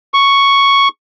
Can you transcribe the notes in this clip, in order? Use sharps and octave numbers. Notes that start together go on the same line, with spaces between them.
C#6